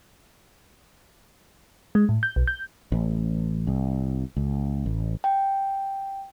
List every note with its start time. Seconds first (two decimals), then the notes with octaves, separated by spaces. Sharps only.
1.95 G#3
2.09 A2
2.23 G6
2.36 B1
2.47 G6
2.92 A1
3.67 C2
4.36 C#2
4.86 A1
5.24 G5